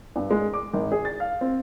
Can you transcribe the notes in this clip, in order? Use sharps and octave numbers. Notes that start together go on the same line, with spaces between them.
G2
G#3
D6
G#1
G#4
A6
F5
C4